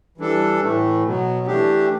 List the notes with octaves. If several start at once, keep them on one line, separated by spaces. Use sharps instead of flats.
E3 G3 D4 A4
A2 E3 A3
B2 F#3 B3
E3 A3 D4 G4